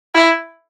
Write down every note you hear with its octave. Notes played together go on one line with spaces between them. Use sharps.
E4